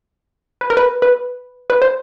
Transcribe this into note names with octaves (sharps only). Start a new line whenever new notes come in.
B4
A#4
B4
B4
B4
C5